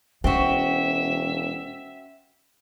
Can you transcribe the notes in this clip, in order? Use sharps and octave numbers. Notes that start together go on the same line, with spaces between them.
E1 C4 C#4 F#4 E5